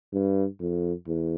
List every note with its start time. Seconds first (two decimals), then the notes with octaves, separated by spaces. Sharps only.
0.13 G2
0.60 F2
1.07 E2